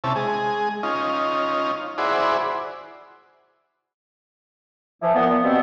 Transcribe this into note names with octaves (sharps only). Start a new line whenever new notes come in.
C3 C#4 E4 A5
G#3 G#4
C#4 D#4 F4
E4 F#4 G#4 C5 D5 B5
E3 F3
A#2 B3
B2 F3 G3 B3 C4